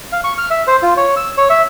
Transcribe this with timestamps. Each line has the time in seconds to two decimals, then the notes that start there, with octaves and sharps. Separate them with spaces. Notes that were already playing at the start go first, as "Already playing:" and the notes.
0.12 F5
0.24 C#6
0.38 F6
0.50 E5
0.67 C5
0.82 F4
0.97 C#5
1.17 E6
1.38 C#5
1.50 E5